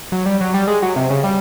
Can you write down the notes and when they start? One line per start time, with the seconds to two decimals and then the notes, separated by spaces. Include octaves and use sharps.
0.12 F#3
0.26 G3
0.41 F#3
0.54 G3
0.67 G#3
0.82 F#3
0.96 C3
1.10 C#3
1.24 G3